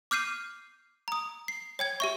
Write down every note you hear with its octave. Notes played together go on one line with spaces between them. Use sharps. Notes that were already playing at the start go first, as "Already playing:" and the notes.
D6 F6 G6 C7 D#7
A#5 D#6
C7
C#5 G5 G#6
G4 E5 C#6